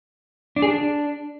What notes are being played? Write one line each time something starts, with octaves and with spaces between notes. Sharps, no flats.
D4
G#4
D4